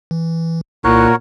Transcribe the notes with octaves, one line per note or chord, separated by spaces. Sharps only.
E3
C2 A#2 E4 F#4 A#4 C#5 F#6